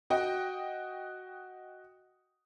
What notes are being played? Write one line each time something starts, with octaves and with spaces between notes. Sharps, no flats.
F#4 D#5 G5